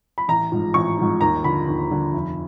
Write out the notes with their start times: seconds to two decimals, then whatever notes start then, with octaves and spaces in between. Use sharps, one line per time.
0.18 B5
0.28 A1 A#5
0.52 G#2 F3
0.74 A1 C#6
0.98 G#2 F3
1.21 D#2 A#5
1.44 D3 F3 B5
1.68 D#2
1.91 D3 F3
2.13 F1